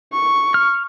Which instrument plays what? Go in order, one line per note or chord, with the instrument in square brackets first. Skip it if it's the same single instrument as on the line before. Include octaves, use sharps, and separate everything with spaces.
[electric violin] C#6
[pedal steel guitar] F6